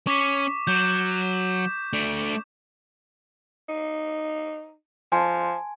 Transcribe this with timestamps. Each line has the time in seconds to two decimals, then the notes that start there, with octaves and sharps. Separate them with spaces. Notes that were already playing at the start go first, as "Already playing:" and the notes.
0.07 C#4 C#6 D6 B6
0.67 F#3 G6 E7
1.93 A3 D4
3.69 D#4
5.12 F3 G#5 A5 C6